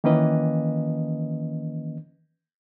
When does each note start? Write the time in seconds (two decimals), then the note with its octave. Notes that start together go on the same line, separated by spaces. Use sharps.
0.04 D#3 E3 A#3 C#4 B4 D#5